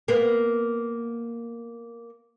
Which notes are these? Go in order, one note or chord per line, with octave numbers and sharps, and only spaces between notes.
A#3 B3